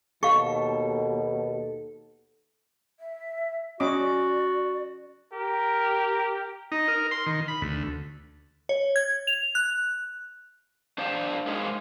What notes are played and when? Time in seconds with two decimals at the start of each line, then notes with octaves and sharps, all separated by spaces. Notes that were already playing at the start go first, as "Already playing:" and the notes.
0.23 D#2 B2 A4 F5 C#6
3.00 E5
3.80 C#4 F#4 D5 D#5 D6
5.34 G4 A#4
6.72 D#4
6.88 A#4
7.11 C6
7.27 D#3
7.48 B5
7.62 D2
8.69 C#5
8.96 G#6
9.27 F7
9.55 F#6
10.98 D4 C5 D5 F5 A5
11.47 G#3 D#4 G#4 A#4 C5 F5